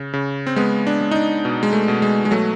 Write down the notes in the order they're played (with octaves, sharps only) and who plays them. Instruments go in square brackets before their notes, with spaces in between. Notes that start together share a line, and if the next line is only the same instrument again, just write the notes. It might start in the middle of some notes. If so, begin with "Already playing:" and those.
Already playing: [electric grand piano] C#3
C#3
C4
G#3 B3
D4
G#3
D#4
D4
B2
G#3
A3
B2
G#3
G#3
F#3 A3